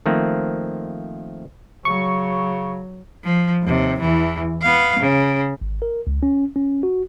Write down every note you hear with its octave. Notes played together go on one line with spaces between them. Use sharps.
D#3 F3 A3 A#3 C4
C#3 F#3 C#6
F3
D#2 C3
E2 E3
B3 F5
C#3
G#1
A#4
C#2
C#4
C#4
F#4